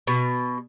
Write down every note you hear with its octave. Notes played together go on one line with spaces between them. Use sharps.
B2